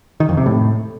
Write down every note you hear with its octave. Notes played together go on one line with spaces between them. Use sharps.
D#3
F2
C3
A2